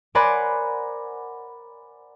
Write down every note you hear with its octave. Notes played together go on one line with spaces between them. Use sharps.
A#4 C5 D5 F#5 G#5 B5